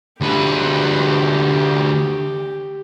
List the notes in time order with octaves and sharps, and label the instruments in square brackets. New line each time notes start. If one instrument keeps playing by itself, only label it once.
[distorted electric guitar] D2 B4 [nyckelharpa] G4